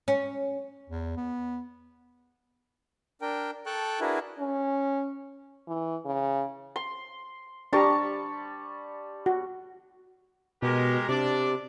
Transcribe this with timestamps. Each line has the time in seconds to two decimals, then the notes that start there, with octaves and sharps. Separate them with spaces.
0.08 C#4
0.89 E2
1.16 B3
3.21 D4 A#4 G5
3.66 A4 G5 A5 C#6 F#6
4.01 D4 E4 F#4 G#4 A#4 B4
4.39 C#4
5.68 E3
6.06 C#3
6.76 C6
7.73 G3 D4 G4 A5 A#5 C#6
9.26 F#4
10.62 B2 G#3 G4 A#4
11.09 C3 D4 D5